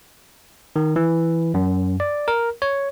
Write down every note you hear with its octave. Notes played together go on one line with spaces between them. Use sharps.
D#3
E3
F#2
D5
A#4
C#5